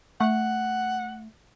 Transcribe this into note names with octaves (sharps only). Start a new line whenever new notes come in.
A3 F#5